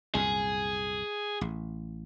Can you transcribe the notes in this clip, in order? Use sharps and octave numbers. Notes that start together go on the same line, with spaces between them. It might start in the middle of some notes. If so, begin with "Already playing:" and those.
C2 F#2 A#2 G#4
A1